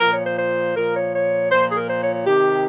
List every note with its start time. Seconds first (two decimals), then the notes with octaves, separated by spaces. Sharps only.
0.01 A#2 F3 A#4
0.13 C#5
0.25 C5
0.38 C5
0.76 A#2 F3 A#4
0.96 C#5
1.14 C#5
1.52 A#2 F3 C5
1.72 G#4
1.77 A#4
1.89 C5
2.02 C#5
2.14 C#5
2.27 C3 D#3 G4